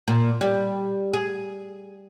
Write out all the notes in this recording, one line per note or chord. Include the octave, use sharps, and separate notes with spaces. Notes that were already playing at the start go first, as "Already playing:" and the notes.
A#2
G3
G#4